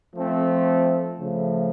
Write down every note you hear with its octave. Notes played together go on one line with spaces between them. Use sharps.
F3 A3 C4
C#3 F3 A3